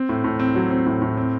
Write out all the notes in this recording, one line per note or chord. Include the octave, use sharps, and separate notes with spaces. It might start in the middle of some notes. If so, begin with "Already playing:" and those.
Already playing: C4
A2
A2
C4
F#3
C4
A2
A2
C4